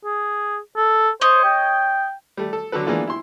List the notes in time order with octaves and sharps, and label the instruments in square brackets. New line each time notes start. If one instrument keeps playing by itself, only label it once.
[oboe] G#4
A4
[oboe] C5 [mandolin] C#5 D#5
[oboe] G5
[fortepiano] G3 A3
A4
D3 F#3 D4 A4 B4
E3 G#3 A#3 B3 D4 F4
E4 C6